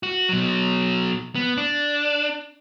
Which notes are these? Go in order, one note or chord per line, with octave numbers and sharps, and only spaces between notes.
F#4
B2 F#3
B3
D4